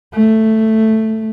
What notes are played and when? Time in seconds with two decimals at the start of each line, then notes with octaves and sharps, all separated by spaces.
0.14 A3